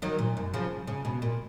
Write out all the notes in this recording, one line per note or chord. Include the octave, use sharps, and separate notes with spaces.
D#3 F#3
A#2
F#2
C#3 F3
C#3
B2
A#2